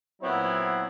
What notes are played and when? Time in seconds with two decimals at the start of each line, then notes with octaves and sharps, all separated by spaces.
0.22 A#2 F#3 B3 C4 E4 C#5